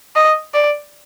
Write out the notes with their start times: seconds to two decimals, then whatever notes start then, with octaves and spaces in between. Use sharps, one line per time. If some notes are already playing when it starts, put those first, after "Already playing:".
0.16 D#5
0.54 D5